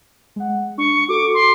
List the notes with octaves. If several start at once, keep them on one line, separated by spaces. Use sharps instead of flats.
G#3 F#5
D4 C#6
F#4 A4 D6
C6